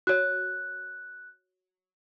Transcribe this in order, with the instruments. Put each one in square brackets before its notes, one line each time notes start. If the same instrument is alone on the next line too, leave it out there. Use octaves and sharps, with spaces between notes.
[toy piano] F#4 C#5 [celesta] F#6